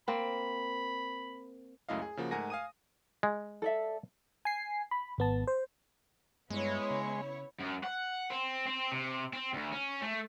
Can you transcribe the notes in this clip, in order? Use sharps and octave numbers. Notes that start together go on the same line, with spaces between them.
A#3 C4 B5
C#2 F#2 A3 E4 D#5 F5
G#4
C#3 F3 A#3 F#4
G#2 A3 A#4 F#5 G#5 A#6
F5 G#5 D#6 D#7
G#3
A4 D5 E5
G#5 C7
B5
G#1 B3 A5
C5
G2 G#3 B3 E4 C#5
C#3
F#2
F#5
C4
C4
C3
C4
D2
C#4
A3